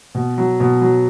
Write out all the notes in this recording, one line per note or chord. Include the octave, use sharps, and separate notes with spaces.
B2
F#3
B2
F#3